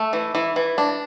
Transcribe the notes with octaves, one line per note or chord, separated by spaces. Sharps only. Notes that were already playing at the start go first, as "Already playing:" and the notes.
Already playing: A3
E3
E3
E3
D4